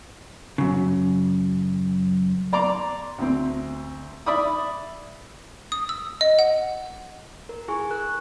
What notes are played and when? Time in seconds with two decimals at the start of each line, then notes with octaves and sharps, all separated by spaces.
0.58 F#2 C#3
2.53 D5 A#5 C6 D6
3.18 D2 C4
4.26 D5 E5 B5 D6 D#6
5.72 D#6
5.89 E6
6.21 D#5
6.39 F#5
7.49 A#4
7.68 E4 G#4 G#5 C#6
7.91 A#4 F#6